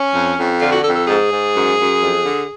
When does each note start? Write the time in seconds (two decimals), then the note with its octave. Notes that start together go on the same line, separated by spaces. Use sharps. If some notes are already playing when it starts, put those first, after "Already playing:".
Already playing: C#4
0.14 F2
0.38 F2
0.61 D3 F4
0.72 F#4
0.84 F2 A4
0.95 A4
1.07 G#2 G#4
1.30 G#2
1.53 F#2
1.77 F#2
2.00 F2
2.23 D3